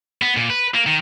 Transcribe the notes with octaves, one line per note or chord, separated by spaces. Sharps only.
B3
A#2
B4
A#3
D#3